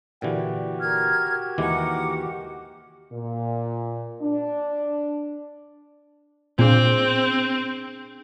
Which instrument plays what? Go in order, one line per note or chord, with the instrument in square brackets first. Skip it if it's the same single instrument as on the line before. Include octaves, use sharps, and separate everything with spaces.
[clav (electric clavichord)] A#2 D3 E3 [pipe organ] F#4 G4
[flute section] A#4 F6 G#6
[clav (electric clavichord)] D#2 E3 G#3 [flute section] A#4 F#5 D6
[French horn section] A#2
D4
[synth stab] A#2 [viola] C4 [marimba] D4 G#4 G6